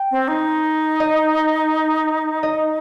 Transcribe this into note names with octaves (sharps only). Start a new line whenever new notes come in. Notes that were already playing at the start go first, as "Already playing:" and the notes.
Already playing: G5
C4
D#4
D#5
D#5